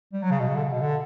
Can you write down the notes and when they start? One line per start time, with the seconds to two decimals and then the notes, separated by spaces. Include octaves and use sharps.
0.13 G3
0.22 F#3
0.31 C#3
0.39 B2
0.48 C#3
0.56 D3
0.63 C#3
0.72 B2
0.81 D3